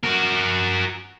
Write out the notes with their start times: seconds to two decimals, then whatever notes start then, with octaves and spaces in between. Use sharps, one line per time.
0.03 F#4 A#4